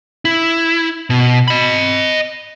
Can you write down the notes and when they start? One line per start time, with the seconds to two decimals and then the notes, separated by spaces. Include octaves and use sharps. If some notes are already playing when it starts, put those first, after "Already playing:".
0.25 E4
1.10 B2
1.48 D#5 B5